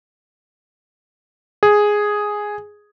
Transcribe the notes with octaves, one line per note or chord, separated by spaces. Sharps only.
G#4